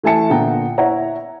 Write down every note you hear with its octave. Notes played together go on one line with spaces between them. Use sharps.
E3 A3 E4 G#5 A5 C#7
A#2 D3 B3 G5 A#5
E4 C#5 F#5 A#5